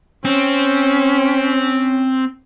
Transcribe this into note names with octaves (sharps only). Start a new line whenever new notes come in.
C4 C#4